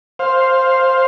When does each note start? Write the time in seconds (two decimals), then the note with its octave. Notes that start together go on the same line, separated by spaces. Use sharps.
0.19 C5 F5